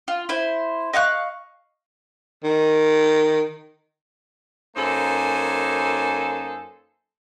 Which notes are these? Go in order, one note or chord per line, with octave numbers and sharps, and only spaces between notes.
F4
E4 C5
D#5 F5 C#6 F#6
D#3
F#2 A#3 D#4 A4 C5 G#5